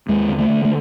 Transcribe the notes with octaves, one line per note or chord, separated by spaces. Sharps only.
D#2 G#3
D3
A3
D3
A3